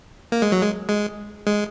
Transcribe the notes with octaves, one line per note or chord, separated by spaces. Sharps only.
A#3
G#3
F#3
G#3
G#3
G#3